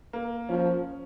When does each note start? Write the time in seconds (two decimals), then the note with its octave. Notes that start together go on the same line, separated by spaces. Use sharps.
0.13 A#3
0.49 F3 C#4